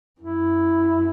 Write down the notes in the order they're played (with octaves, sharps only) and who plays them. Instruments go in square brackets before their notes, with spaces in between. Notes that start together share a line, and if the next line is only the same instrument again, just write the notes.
[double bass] F#2 [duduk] E4